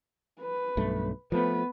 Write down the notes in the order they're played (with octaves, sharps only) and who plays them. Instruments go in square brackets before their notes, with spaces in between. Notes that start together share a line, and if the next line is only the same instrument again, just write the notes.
[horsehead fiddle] B4
[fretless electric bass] B1 G2 A3
[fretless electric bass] F3 A3 [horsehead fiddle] B3 B4